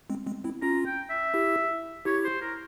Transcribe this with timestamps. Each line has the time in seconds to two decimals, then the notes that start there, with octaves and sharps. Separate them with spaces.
0.10 G#3 C4
0.27 G#3 C4
0.44 C4 E4
0.62 C#4 F4 A#5
0.86 G5
1.10 E5
1.34 E4 G4
2.05 E4 G4 C#5
2.25 C5
2.42 A#4